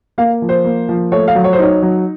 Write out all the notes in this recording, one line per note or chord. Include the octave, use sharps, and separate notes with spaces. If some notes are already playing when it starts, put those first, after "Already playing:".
A#3 F5
F3
C5
A#3
F3
A3 C#5
F5
F#3
C#5
C5
D#4 C#5
F#3